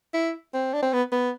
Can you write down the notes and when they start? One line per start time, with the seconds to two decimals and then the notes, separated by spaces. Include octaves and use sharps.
0.13 E4
0.54 C4
0.73 D4
0.82 C4
0.93 B3
1.12 B3